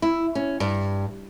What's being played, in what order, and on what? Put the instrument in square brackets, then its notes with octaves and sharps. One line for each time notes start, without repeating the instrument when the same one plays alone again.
[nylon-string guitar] E4
C#4
G2